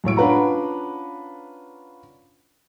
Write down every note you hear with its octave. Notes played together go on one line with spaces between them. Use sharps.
F#2 A2 C#5 D7
C#4 D4 F4 B4 F#5 A#5